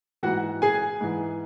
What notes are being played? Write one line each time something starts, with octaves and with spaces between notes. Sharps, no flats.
G#2 E3 F#4 F#5
G#4 G#5
G#2 E3